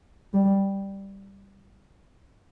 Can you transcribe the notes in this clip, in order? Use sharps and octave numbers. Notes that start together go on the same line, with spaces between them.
G3